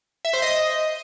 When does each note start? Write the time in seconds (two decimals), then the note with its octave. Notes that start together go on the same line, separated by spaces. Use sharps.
0.25 E5
0.33 C5
0.42 D#5